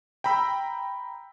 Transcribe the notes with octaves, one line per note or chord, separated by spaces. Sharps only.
G5 A#5 B5 E6